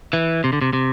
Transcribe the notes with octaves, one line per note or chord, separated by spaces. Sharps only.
E3
C3
D3
C3
C3